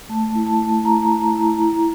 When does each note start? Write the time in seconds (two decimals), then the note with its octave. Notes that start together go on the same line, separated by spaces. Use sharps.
0.09 A3 A5
0.35 E4
0.46 A5
0.59 A3
0.84 E4 A#5
1.09 A3
1.34 E4
1.59 E4